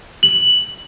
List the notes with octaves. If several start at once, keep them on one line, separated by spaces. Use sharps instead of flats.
F#7